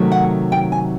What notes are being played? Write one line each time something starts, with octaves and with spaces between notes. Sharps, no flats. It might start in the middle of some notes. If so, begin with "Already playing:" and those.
Already playing: C3 D#3 F#3 A3
F#5
G5
G#5